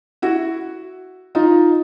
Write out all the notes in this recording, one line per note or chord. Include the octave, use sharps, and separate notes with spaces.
E4 F#4
D#4 F4